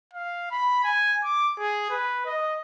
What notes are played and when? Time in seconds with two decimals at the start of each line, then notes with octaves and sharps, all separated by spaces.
0.14 F5
0.51 B5
0.84 G#5
1.24 D6
1.59 G#4
1.90 B4
2.26 D#5